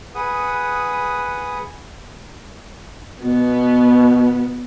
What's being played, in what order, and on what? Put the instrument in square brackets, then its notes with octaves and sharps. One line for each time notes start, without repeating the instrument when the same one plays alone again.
[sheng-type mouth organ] G#4 B4 F#5 D#6
[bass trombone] B2 [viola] B3